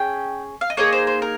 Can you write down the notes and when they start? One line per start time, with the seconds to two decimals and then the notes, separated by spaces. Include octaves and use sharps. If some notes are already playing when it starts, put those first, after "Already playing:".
Already playing: C#4 G#4 G5
0.61 F5
0.70 D#5
0.77 A#3 D#4 G#4 C#5
0.92 C5
1.07 C5
1.22 A#4